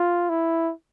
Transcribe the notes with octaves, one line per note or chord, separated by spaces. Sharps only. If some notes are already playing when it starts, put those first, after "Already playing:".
Already playing: F4
E4